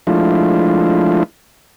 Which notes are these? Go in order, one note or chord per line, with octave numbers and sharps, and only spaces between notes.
F3 G#3 A3 D4 E4 F4